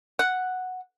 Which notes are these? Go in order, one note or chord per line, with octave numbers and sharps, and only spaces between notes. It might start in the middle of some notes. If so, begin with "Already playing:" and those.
F#5